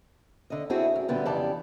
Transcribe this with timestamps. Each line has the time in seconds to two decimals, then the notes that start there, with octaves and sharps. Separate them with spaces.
0.50 D3 D#5
0.70 C4 D4 E4 F#4 G#4
0.96 F#2
1.08 A#2 D3 G3 B3 G4
1.25 F2 C#3 E3 G4 D5 A5